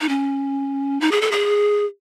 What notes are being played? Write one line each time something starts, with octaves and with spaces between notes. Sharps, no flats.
D#4
C#4
D#4
G#4
A4
G#4